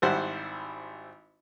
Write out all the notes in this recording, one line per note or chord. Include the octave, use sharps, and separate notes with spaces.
G#1 G3 E4 C5 F#5